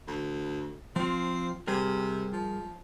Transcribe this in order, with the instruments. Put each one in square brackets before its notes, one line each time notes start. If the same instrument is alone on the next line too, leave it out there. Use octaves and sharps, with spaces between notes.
[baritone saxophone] D2
[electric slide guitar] F3 F4 [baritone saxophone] C4
[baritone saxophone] C3 [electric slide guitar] G3 G#4 A#4
[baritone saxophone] F3